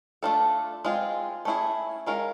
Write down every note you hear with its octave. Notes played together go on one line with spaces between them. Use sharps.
A3 D4 F4 A4
G#3 C4 F4 G#4
A3 C#4 E4 G#4
D#3 G#3 C#4 F4 A#4